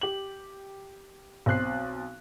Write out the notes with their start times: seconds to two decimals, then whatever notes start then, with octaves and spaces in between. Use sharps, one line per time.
0.01 G4 F#7
1.46 B1 C4 F#6 C7